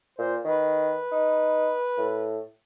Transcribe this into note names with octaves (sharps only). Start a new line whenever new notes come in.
A#2 C5
D#3 B4
D#4
A2